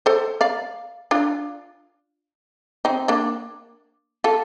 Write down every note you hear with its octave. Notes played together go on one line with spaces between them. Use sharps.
A4 C5
D5 F5
D4 F4
C4 D#4
A#3 D4
F4 A4